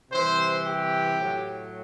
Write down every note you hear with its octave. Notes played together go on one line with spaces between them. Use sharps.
C3 E3 G3 C5
G4
A2 F#3